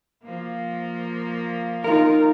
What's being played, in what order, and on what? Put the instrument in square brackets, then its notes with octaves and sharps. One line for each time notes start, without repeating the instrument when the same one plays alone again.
[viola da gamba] F3 A#3
[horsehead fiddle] D#4 F4 [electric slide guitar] A#4